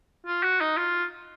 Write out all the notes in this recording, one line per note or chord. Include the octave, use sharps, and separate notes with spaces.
F4
F#4
D#4
F4